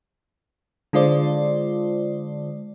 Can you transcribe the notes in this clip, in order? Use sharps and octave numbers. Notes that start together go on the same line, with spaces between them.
D3 G#3 F4 C5 D5